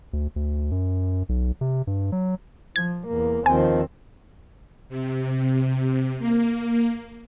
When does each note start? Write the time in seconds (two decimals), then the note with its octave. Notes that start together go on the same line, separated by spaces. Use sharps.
0.13 D2
0.36 D2
0.71 F#2
1.29 B1
1.61 C3
1.87 G2
2.12 F#3
2.76 F3 G#6
3.07 E2 A#3
3.46 D#2 D#3 F3 C4 G#5
4.89 C3
6.19 A#3